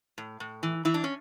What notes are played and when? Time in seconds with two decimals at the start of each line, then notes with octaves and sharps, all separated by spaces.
0.18 A2
0.40 A2
0.63 E3
0.85 E3 E4
0.94 D4
1.04 C#4